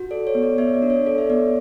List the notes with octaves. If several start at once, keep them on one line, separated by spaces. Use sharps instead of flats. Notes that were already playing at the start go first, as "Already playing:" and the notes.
Already playing: F#4
A4 D5
C#5
B3
D5
B3 C#5 E5
D5
D4
C#5
A4 D5
C#5 E5
B3 D5